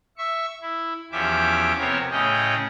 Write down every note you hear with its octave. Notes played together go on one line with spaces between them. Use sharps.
E5 C#6
E4
E2 F3 C#4 G4 E5 D6
C3 B3 C4 A#4 C#5
A2 C#3 C#4 G#4 D#5 G5